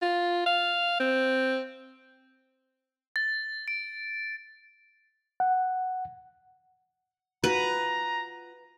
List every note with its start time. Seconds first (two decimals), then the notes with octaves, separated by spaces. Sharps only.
0.02 F4
0.46 F5
1.00 C4
3.16 A6
3.68 D7
5.40 F#5
7.44 F4 F#4 B4 A#5